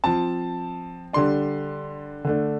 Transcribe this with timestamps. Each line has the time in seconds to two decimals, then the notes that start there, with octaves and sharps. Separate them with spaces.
0.04 F3 C4 A5
1.13 D3 G3 D4 C6
2.25 D3 A3 D4